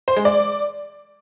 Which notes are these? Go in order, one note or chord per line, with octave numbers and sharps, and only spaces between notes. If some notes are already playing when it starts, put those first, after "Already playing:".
C5
G#3
D5